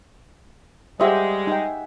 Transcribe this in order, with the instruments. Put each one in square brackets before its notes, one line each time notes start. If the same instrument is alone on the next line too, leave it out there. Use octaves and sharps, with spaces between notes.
[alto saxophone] G3 [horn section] G#3 [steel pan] G4 C5 D#5 [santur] G#4 E5 F#5
[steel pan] D#4 G5